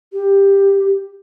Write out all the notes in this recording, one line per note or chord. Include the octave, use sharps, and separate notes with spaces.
G4